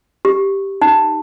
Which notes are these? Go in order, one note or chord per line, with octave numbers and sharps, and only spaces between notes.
G4
D#4